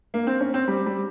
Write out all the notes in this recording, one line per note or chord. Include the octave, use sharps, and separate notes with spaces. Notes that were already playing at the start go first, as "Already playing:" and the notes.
A#3
C4
C#4
C4
G3
G3